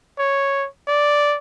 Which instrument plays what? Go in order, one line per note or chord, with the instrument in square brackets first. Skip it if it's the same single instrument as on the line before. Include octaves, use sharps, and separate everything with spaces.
[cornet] C#5
D5